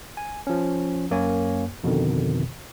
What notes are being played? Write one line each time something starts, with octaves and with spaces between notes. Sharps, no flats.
G#5
F3 C#4
F#2 A#3 C#5 G#5
F2 B2 D3 D#3